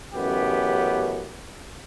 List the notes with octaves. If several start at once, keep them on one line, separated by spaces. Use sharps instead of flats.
A1 F#2 C#3 B3 G4